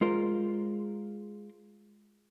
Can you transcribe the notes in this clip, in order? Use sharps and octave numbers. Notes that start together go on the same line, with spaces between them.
G#3 F4 A#4 C5